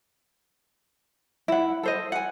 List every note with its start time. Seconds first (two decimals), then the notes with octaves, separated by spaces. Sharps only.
1.48 E4 F#5
1.83 A4 C5 D#5
2.12 F#5 G#5